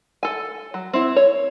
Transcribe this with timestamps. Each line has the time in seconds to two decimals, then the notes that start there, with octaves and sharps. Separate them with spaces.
0.23 A4 G#5
0.74 F#3
0.93 C4 E4
1.16 C#5